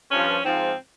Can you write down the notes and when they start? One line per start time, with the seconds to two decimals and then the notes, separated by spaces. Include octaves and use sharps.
0.10 G2 F3 C#4
0.45 G#2 F3 C4